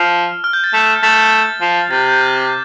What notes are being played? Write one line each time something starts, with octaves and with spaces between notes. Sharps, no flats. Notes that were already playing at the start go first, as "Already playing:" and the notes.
Already playing: F3 F6
F6
G6
A6
A3
A3 A6
F3
C3 A6
G6
F6
D6